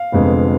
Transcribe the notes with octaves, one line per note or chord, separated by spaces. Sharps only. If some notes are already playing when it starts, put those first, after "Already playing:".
Already playing: F5
F1 F2 D3 G#3 B3